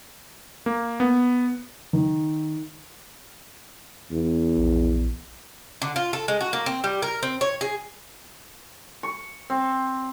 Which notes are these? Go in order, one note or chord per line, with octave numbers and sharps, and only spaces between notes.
A#3
B3
D#3
E2
A#1
D3
F4
A4
G#3
F#4
A#3
C4
G3
A#4
C4
C#5
G#4
C#6
C4